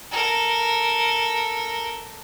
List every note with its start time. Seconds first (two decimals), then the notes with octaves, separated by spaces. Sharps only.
0.12 A4 A#4